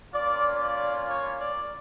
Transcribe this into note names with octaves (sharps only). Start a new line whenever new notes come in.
A#3 C#4 F4 D5
D5
C#5
D5